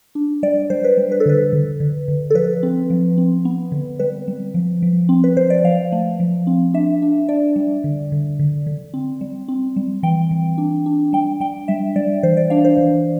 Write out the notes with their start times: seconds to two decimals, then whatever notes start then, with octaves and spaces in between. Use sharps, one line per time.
0.15 D4
0.43 G3 D5
0.70 G3 C5
0.84 B4
0.97 G3
1.12 B4
1.20 A4
1.26 D3 B4
1.53 D3
1.80 D3
2.08 D3
2.30 A4
2.35 F3 B4
2.63 C4
2.90 F3
3.18 C4
3.45 B3
3.72 D3
3.99 G3 B4
4.28 G3
4.54 F3
4.82 F3
5.09 C4
5.24 B4
5.37 F3 C5
5.50 D5
5.64 F3 F5
5.92 A3
6.20 F3
6.47 C4
6.74 D4 E5
7.02 D4
7.28 D4 D5
7.56 G3
7.84 D3
8.12 D3
8.39 D3
8.66 D3
8.94 C4
9.21 G3
9.48 C4
9.76 G3
10.03 E3 G5
10.31 E3
10.58 D4
10.86 D4
11.13 G3 G5
11.40 G3 G5
11.68 G3 E5
11.96 G3 D5
12.23 E3 C5
12.37 D5
12.50 D4 F5
12.65 C5
12.77 E3